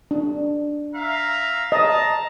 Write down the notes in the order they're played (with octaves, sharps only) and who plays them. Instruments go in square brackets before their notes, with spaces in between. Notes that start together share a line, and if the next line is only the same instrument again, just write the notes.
[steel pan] D4
[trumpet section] E5 F5 A#5
[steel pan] D#5 [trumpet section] A5 A#5